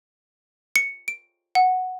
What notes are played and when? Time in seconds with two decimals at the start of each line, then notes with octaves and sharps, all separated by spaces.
0.76 C#7
1.08 D7
1.55 F#5